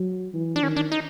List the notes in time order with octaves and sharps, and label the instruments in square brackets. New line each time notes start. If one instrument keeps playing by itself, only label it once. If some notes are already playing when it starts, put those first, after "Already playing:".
Already playing: [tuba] F#3
E3
[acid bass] D4
[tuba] D#3 [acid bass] C#4
[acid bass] D4
D#4